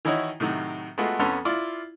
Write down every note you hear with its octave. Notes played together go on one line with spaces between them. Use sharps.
D#3 E3 D#4 E4 F#4 C#5
A2 C3 D#3 F#3
G#3 A3 B3 F4 F#4
F2 B3 C#4 A4 C6
E4 F4 D5